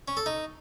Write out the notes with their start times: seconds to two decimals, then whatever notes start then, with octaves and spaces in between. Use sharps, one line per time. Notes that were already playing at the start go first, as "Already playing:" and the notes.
0.08 C#4
0.17 A4
0.26 D#4